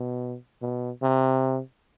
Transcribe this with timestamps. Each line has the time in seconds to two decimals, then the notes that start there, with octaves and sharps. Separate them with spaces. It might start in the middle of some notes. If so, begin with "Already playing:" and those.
Already playing: B2
0.62 B2
1.03 C3